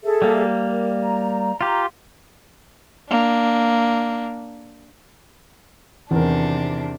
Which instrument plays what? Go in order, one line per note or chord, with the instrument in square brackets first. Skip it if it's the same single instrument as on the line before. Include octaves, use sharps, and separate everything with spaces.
[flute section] G#4 A4 E5
[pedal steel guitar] G3 A#3
[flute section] A#4
A#5
[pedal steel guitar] F4 G4 [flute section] A#5
[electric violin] A#3 D4
[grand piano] E2 D#3 A#4 [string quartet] C3 D4 [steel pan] E3 C4 E4